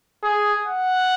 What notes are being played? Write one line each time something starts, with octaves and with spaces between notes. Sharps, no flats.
G#4
F#5